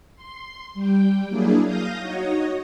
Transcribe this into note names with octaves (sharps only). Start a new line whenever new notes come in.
C6
G3 G5
F#3 A#3 D4 E4 G#4
F5 D#6 G6 A#6
D#4 F#4 C#5 D#5